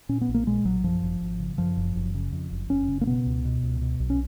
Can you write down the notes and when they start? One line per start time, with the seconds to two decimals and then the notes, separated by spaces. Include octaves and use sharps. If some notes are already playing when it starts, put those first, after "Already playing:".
0.09 A#2 C#4
0.21 B3
0.28 A#1
0.34 A#3
0.47 A#2 G#3
0.65 A#1 F#3
0.84 F#2 F3
1.02 G#1
1.21 G#1
1.40 C#3
1.58 F#2 F3
1.77 F#1
1.96 F#1
2.14 C#3
2.32 F2
2.51 F#1
2.70 F#1 C#4
2.88 C#3
3.01 A#3
3.07 B2 B3
3.26 C#2
3.45 B2
3.63 C#2
3.82 B2
4.00 B1
4.10 C#4